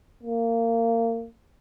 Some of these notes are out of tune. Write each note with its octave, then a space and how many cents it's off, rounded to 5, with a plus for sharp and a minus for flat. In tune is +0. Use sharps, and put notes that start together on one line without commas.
A#3 -25